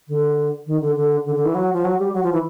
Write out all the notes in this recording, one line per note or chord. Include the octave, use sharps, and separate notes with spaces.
D3
D#3
D3
D3
D3
D3
E3
F#3
F3
F#3
G3
F#3
F3
E3